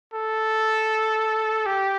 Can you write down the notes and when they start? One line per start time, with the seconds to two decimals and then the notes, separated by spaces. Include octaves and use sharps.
0.13 A4
1.66 G4